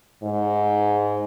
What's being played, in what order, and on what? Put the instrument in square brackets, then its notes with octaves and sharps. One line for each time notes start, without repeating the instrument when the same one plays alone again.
[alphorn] G#2